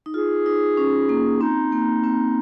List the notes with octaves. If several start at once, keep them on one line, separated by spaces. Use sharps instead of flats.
D#4
F4 G#4
D#4
C#4
A#3
C4 D#4
A#3
C4